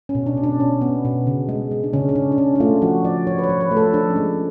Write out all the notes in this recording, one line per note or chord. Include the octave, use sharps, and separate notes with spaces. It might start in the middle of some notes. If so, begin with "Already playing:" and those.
C#4
B2
D4
B2
D4
B2 C#4
B3
B2
C#3
G#3
G#3
D4
C#3 C#4
C#4
C#3 D4
D4
C#3 C#4
D4
A3 F4
F3 F#4
F3 D5
F3 C#5
B4
C#5
F3
B4
A3
A4
F3 D4
C#4
G#3